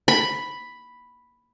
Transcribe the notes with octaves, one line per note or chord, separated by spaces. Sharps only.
B5